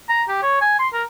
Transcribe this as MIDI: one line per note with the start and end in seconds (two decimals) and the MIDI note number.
0.09 0.23 82
0.28 0.38 67
0.42 0.57 73
0.61 0.75 80
0.79 0.88 84
0.93 1.03 70